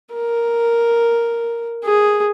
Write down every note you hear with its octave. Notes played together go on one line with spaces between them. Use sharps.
A#4
G#4